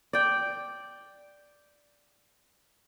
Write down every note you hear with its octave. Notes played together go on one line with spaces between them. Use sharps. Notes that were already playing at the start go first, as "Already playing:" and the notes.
D5 G5